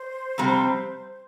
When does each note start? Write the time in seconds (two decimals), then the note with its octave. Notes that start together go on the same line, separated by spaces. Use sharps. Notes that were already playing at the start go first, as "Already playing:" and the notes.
Already playing: C5
0.38 F2 C3 G3 C4